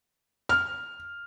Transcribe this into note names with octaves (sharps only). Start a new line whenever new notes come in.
F6